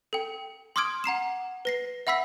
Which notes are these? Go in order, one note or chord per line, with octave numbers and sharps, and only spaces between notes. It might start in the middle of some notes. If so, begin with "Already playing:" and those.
A4 G5
C6 D6 D#6 F6 G#6 D7
F#5 A#5 C7 E7
B4 A#6 C7
E5 F#5 B5 E6 B6